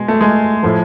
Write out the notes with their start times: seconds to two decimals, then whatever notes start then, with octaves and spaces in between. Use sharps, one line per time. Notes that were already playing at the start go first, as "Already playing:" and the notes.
Already playing: B2 G#3
0.08 A3
0.21 G#3
0.63 A2 F3